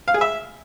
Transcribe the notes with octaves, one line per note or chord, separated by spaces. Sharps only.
F5
G#4
E5